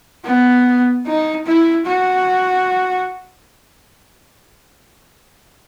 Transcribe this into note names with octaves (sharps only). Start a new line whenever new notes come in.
B3
D#4
E4
F#4